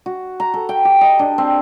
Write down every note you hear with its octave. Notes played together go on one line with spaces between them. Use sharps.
F#4
A#5
A4
G5
G4
D#5
D4
C4